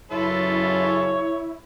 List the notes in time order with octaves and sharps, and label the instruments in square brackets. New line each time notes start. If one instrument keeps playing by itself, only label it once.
[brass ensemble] F#2 C#3 [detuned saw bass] E4 [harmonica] F4 A4 B4 [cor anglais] C#5